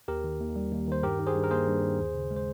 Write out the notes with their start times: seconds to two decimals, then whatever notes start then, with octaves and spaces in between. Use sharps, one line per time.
0.08 D#2 G4 A#4
0.24 D#3
0.40 D#2
0.56 G3
0.72 D#2
0.87 D#3 C5
1.03 G2 G4 A#4
1.19 D#3
1.27 G#4 C5
1.35 G2
1.44 A#4
1.51 A#3 G#4 C5
1.67 G2
1.83 D#3
1.99 D#2
2.15 C#3
2.31 G#3
2.36 C5